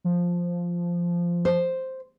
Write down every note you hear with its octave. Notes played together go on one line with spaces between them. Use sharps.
F3
C5